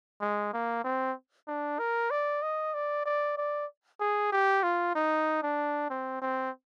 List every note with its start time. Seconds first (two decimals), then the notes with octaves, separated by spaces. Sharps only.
0.21 G#3
0.53 A#3
0.84 C4
1.48 D4
1.79 A#4
2.11 D5
2.42 D#5
2.74 D5
3.06 D5
3.37 D5
4.00 G#4
4.32 G4
4.63 F4
4.95 D#4
5.43 D4
5.90 C4
6.22 C4